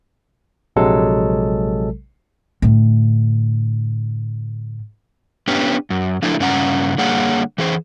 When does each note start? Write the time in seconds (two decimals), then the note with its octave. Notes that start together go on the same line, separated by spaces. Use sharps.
0.76 A#1 C3 F#3 G#3 A4
2.62 A2 D3
5.48 B3 C#4 D4 G4
5.90 F#2
6.22 F3 A3 D4 E4
6.40 G2 C#3 C#4 F#5 G#5 A#5
6.98 D3 G3 A#3 G#4 C#5 F#5
7.58 E3 G#4 C5